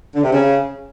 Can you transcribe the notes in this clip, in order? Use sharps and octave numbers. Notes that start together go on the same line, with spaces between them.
D3
C3
C#3